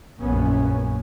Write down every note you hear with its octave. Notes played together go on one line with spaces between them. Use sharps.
A#1 F#2 A#3 B3 C#4